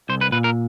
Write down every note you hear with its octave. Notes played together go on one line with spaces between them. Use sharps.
C2 C5
B4
A#2 B4
A#4